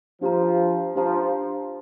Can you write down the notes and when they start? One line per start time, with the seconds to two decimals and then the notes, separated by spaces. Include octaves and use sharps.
0.21 F3 D4 G4 C5 F5 A#5
0.96 F3 D4 G4 C5 F5 A#5